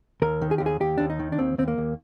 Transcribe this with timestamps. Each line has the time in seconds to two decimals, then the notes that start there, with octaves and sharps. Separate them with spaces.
0.22 D#2 A#4
0.41 D#3
0.51 G#4
0.58 D#2 G4
0.66 G#4
0.81 D#2 G4
0.98 D#2 D4
1.10 D#4
1.19 D#3
1.32 D4
1.38 D#2 C4
1.58 D#2 C4
1.68 A#3
1.78 D#2